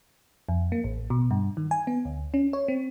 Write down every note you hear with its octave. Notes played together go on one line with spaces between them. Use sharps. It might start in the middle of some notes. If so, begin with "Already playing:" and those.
F2
A#3
A1
B2
G2
D#3
G#5
B3
D2
C#4
C#5
C4